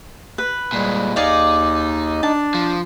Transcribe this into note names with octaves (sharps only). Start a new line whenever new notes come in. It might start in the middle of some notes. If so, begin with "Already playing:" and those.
B4
A#2 G3 G#3
D#2 D#4 G#4 D5 F5
D4 A5
F3